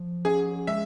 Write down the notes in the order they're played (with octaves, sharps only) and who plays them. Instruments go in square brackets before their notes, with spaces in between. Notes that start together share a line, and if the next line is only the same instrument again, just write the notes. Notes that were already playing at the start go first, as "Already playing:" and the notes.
Already playing: [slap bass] F3
[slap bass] C#4 [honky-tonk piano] G#4
[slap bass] G#3 [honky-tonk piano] E5